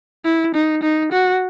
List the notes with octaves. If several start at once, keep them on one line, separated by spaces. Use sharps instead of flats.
E4
D#4
D#4
F#4